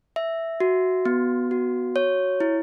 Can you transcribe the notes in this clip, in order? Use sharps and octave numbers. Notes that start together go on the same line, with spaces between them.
E5
F#4
B3
F#4
C#5
E4